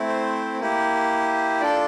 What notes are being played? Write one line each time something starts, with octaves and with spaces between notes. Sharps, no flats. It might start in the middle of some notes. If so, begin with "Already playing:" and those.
Already playing: A3 C4 E4
C5
A#3 E4 G4
D4 F4 A4 D5